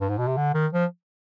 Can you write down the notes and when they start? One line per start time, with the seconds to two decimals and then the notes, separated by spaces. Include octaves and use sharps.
0.01 G2
0.09 G#2
0.18 B2
0.28 C3
0.37 D3
0.54 D#3
0.73 F3